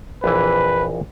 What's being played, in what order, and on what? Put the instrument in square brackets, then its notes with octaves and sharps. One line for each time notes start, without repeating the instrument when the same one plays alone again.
[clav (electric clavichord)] A#1 F2 E3 [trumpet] B4